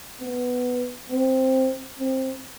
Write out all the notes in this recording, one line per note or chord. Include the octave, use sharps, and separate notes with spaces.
B3
C4
C4